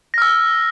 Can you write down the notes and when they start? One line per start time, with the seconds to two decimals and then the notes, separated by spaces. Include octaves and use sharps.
0.14 A#6
0.18 F6
0.22 E6